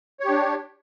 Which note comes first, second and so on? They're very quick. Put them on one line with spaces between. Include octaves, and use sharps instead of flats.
C#5 G4 D4